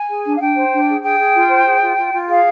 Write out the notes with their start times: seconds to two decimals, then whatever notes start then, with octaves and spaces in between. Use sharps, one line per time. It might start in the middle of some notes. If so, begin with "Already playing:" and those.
Already playing: G#5
0.09 G#4
0.25 D4
0.36 F5
0.41 D4 G5
0.57 C5
0.72 D4
0.88 G#4
1.03 G#4 G5
1.19 G#4
1.35 F4
1.50 C5
1.66 G#4
1.82 F4
1.97 F4
2.13 F4
2.29 G#4 F5